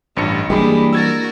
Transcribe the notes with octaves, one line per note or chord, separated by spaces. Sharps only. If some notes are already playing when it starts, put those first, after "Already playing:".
A1 G2 F4 C#7
E3 G3 G#3 A#3 D4 G4 G#4 B5
F#4 A#4 E6 G#6 A6